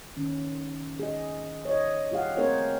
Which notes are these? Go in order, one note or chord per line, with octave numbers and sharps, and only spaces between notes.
D#3 C#4
G#4 D#5
C#5 D#5
F4 G4 G#4 F5 F#5
A3 C4 G#4 A#4 C5 C#5